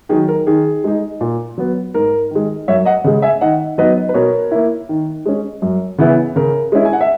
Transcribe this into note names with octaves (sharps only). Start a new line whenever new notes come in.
D#3 F#3 G#4
A#4
D#3 G#4
G#3 D#4
A#2
F#3 B3
G#2 A#4
D#3 G#3
F#2 C#5 E5
D#5 F#5
C#3 G#3
E5 G#5
D#3 D#5 F#5
F#3 B3 D#4 B4 D#5
B4
B2 A#4 C#5
A#3 E4
D#3
G#3 C#4
F#2
C#3 E3 B3 E4
C#3 A#4
G#3 C#4 E4
G#5
F#5
E5